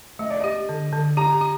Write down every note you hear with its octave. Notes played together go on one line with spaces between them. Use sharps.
A3 D#5
D5
G4 D#5
D3
D3
G4 A#5
G4